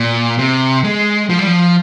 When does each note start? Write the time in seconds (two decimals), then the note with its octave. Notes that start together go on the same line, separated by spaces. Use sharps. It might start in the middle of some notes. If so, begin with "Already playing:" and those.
Already playing: A#2
0.39 C3
0.84 G#3
1.30 F3
1.39 G3
1.47 F3